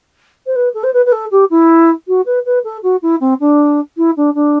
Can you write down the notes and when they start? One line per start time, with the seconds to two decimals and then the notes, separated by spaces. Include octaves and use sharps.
0.46 C5
0.55 B4
0.74 A4
0.83 C5
0.93 B4
1.05 B4
1.12 A4
1.31 G4
1.50 E4
2.08 F#4
2.26 B4
2.45 B4
2.64 A4
2.83 F#4
3.02 E4
3.20 C4
3.40 D4
3.97 E4
4.16 D4
4.34 D4